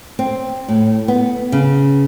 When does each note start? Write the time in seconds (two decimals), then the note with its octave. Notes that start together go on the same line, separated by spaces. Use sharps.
0.19 C4
0.68 A2
1.08 B3
1.52 C#3